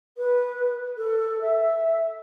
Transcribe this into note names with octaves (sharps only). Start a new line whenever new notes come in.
B4
A4
E5